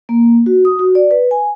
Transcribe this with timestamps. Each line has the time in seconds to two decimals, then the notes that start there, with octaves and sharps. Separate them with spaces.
0.09 A#3
0.46 F#4
0.65 D#6
0.79 F#4
0.95 D5
1.11 B4
1.31 G#5